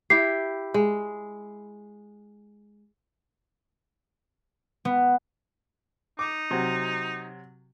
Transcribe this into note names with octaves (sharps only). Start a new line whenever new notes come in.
E4 G4 C7
G#3
B3
D#4 D6
C3 F#3